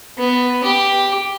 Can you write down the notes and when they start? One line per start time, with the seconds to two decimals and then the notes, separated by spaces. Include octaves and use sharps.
0.18 B3
0.64 G4